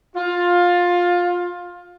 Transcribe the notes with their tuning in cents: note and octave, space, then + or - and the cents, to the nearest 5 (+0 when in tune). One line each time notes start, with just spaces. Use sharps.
F4 +15